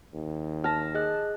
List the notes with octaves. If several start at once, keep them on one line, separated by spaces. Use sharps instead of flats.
D#2
A5 F6 A#6
G#4 D#5 F#6